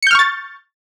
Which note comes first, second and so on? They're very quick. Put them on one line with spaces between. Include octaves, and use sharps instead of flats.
C#7 G6 F6 C#6 A6